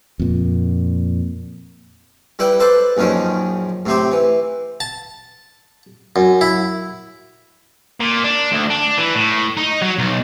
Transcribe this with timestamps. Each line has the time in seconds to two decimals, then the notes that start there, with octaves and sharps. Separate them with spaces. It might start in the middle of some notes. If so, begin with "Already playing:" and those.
0.19 F2 A#2
2.39 G3 E4 B4 G5
2.60 A4 B4 C5 D5
2.97 A#1 F#2 D#3 F3 C#4
3.86 A2 C3 C4 G4
4.12 E3
4.80 A5
6.16 F#2
6.41 E4
8.00 A#2
8.24 D4
8.52 D2
8.70 D4
8.97 E3
9.15 A2
9.57 D#4
9.82 F#3
9.99 B1